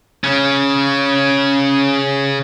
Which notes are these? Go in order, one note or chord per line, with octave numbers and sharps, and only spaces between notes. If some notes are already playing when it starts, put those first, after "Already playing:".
C#3 C#4